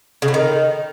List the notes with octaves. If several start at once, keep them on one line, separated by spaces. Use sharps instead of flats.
C#3
A2
D#3